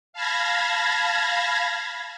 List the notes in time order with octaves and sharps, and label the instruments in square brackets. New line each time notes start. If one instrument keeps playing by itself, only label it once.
[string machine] F5 A5 B5 G#6 A#6